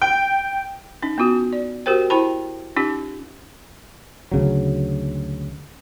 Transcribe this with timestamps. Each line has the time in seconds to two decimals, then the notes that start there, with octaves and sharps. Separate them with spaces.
0.02 G5
1.03 C#4 D#4
1.18 B3 C#4 F4 F#4
1.53 D5
1.86 F#4 G4 A#4 C5 G5
2.10 E4 C5 G5 A5 B5
2.76 C#4 D#4 F4 G4
4.32 D2 C#3 F#3